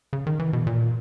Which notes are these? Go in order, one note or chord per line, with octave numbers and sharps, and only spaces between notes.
C#3
D#3
E3
B2
A#2